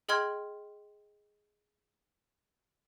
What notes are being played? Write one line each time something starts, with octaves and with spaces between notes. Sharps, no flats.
G#4 D#5 G5 C6 F6 G#6